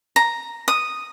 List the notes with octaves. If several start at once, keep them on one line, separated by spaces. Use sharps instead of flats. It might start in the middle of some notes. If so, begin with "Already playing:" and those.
A#5
D#6